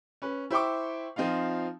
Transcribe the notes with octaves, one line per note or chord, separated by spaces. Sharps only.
C#4 B4
E4 C5 G5 C#6 D6
F3 C4 D#4 F4 F5